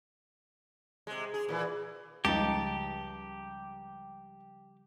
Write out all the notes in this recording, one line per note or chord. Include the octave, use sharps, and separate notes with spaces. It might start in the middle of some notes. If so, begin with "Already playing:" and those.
C3 G#3
G#4
A#2 E3
C#2 C#3 F3 G3 D#4 G4 A5